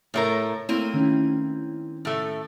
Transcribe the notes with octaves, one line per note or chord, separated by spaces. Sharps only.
A2 A3 A#4 C#5
A3 A#3 C4 E4 D#7
D#3 C#4 E4
A2 A3